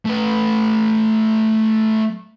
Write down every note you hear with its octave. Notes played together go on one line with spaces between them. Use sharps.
A3 B4